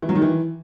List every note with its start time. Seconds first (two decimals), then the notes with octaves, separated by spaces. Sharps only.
0.02 E3
0.09 F#3
0.15 D#3
0.22 E3